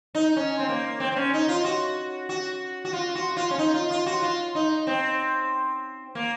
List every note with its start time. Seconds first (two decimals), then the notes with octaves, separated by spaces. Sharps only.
0.15 D#4
0.37 C#4
0.59 C4
0.69 A#3
1.00 C4
1.12 C4
1.16 C#4
1.33 D#4
1.48 F4
1.65 F#4
2.29 F#4
2.85 F#4
2.93 F4
3.15 F#4
3.37 F4
3.51 C#4
3.58 D#4
3.74 F4
3.91 F4
4.06 F#4
4.22 F4
4.55 D#4
4.87 C4
6.15 A#3